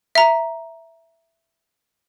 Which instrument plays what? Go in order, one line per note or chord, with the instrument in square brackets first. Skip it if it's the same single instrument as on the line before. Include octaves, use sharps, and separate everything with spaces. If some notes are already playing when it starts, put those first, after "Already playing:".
[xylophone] E5 A#5